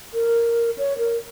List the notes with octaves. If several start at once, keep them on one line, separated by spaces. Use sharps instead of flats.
A#4
C#5
A#4